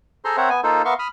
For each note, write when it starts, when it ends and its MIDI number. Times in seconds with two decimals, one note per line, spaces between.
0.25 0.37 68
0.25 0.37 69
0.25 0.37 72
0.25 0.37 82
0.25 0.37 84
0.37 0.49 60
0.37 0.49 70
0.37 0.49 72
0.37 0.49 73
0.37 0.49 76
0.37 0.49 78
0.50 0.61 59
0.50 0.61 80
0.64 0.82 58
0.64 0.82 63
0.64 0.82 65
0.64 0.82 69
0.64 0.82 72
0.85 0.94 59
0.85 0.94 70
0.85 0.94 76
0.85 0.94 77
0.85 0.94 84
0.85 0.94 85
0.99 1.08 83
0.99 1.08 87
0.99 1.08 89